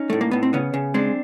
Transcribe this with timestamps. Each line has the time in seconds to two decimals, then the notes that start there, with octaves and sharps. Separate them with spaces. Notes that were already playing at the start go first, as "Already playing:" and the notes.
Already playing: C#4 D#4
0.10 A2 A3
0.21 A#3
0.31 A2 B3
0.43 C4
0.53 C#3 B3 C#4
0.74 C#3
0.94 G#3 C4 D4